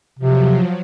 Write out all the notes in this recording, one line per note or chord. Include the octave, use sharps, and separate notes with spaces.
C3 F3 F#3